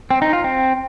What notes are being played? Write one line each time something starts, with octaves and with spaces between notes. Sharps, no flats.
C4
D#4
F4
C4